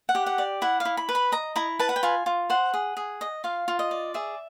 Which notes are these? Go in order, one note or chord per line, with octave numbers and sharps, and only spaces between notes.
F#5
G4
F#5
D5
E4 F#5
F5
E4
B5
B4
B5
D#5 A#5
E4 A#5
B4 A5
F#5
G5
F4 G#5
F4
C5 F#5
G#4
G#4
D#5
F4 F5
F4
D#5
D5
G#4 E5